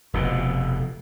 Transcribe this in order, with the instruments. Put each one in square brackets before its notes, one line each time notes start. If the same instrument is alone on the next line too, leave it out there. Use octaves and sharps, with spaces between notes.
[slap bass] F1 B2